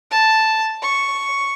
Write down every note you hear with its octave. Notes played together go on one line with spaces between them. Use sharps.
A5
C#6